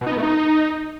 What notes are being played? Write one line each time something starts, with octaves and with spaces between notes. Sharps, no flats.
B2
D#4
B3
A3
D#4